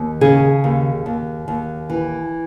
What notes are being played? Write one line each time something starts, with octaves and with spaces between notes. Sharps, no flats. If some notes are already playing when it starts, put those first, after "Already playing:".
Already playing: D#2
C#3 G#4
D#2
D#2
D#2
E3